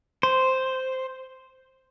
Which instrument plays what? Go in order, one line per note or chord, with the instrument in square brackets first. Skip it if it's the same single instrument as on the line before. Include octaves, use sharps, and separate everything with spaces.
[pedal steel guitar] C5